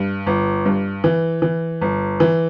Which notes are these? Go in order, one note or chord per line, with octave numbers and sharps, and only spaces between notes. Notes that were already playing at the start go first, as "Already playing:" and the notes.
Already playing: G2
G1
G2
E3
E3
G1
E3